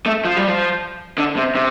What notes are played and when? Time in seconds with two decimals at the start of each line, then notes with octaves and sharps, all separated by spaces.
0.06 A3
0.25 F3
0.36 G3
0.48 F3
1.18 D3
1.36 C3
1.55 C3